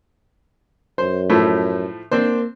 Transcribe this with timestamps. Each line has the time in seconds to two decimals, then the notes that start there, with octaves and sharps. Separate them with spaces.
0.98 F#2 C5
1.30 A2 F3 A3
2.11 A#3 C4 D4 C5